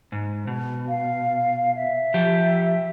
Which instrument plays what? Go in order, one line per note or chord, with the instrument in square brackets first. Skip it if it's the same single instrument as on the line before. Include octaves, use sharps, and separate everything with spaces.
[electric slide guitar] G#2
B2
[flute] F5
E5
[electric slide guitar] F3 G4